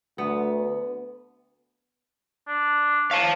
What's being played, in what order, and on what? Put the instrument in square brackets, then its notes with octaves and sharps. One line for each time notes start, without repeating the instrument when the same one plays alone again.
[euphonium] D2 [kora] B3
[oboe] D4
[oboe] C#5 [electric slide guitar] F5 A5